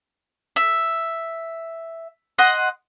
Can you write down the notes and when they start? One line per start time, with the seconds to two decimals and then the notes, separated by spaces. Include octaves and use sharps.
0.56 E5
2.38 D#5 F#5 C6